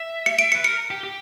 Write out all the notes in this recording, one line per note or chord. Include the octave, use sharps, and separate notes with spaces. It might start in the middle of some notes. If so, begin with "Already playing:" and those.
Already playing: E5
C#7
D7
C#7
B4
A#4 C#7
G4
G4